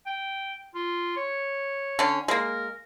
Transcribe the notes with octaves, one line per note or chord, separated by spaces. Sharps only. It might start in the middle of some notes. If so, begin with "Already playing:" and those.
G5
F4
C#5
D3 C#4
G#3 A#3 A#4